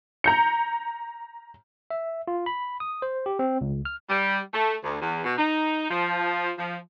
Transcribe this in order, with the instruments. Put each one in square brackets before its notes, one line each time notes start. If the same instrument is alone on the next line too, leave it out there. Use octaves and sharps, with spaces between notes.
[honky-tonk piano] A#5 G6 C#7
[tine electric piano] E5
F4
B5
D#6
C5
G4
C4
C#2
F6
[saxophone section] G3
A3
D2
E2
B2
D#4
F3
F3